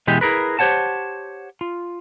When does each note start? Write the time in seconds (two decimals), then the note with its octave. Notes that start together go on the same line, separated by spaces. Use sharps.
0.07 B2 E3 G#3 G4
0.21 E4 G#4 A#4 B4
0.59 G4 C5 C#5 F#5 A5
1.61 F4